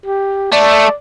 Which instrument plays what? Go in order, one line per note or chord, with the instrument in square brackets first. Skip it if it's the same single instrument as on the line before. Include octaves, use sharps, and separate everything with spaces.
[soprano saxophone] G4
[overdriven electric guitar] A3 [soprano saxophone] D5